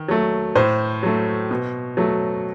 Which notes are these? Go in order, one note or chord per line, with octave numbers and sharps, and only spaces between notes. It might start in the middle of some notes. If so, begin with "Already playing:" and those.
Already playing: D#3
F#3 A3
A2 C5
F#3 A3
B2
F#3 A3